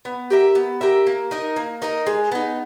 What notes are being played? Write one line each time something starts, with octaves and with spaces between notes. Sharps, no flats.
B3
G4 A#4 E5
B3
G4 A#4 E5
A#3
D#4 A#4 D#5
A#3
D#4 A#4 D#5
G#3
B3 D#4